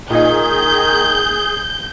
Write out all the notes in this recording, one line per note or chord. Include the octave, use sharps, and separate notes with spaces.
A#2 D#3 D#4 G#4 G6